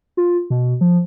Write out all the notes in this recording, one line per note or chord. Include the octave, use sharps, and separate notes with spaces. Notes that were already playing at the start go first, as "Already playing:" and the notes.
F4
B2
F3